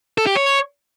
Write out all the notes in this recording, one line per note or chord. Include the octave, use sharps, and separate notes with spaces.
A4
G4
C#5